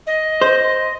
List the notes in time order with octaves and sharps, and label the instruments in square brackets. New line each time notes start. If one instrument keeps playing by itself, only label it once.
[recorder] D#5
[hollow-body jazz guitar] C5